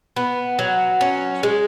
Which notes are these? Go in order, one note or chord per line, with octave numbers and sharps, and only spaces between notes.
B3
F#3
C#4
G#3